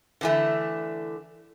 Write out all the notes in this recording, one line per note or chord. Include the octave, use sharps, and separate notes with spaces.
D3 E3 A3